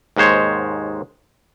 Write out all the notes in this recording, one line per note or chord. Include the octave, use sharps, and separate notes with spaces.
D#2 G#2 G#3 C5 C#5